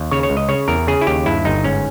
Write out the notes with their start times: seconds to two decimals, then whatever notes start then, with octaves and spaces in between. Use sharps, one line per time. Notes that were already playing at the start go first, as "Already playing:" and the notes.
Already playing: D#2
0.11 C#3 C#5
0.23 C#5
0.30 C#2
0.37 D#5
0.49 C#3 C#5
0.68 E2 A#4
0.88 C#3 G#4
1.01 E4
1.07 D#2 G4
1.26 G2 E4
1.45 G1 D#4
1.64 G#2 C#4